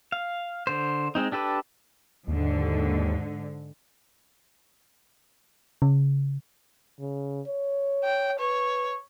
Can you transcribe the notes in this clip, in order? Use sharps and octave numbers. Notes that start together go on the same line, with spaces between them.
F5
D3 C5
G#3 C4 D#4
D4 G4 A4 B4
D#2 G#2 D3
C#3
C#3
C#5
G5
B4 C#5